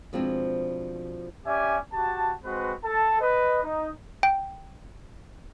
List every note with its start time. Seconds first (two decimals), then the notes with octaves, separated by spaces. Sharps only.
0.13 B2 F3 G#3 C4 D4
1.46 C#4 G4 D5 E5 G#5
1.93 F#4 G4 A5
2.44 G#3 C4 F#4 B4
2.85 A4 A5
3.20 B4 D#5
3.64 D#4
4.23 G5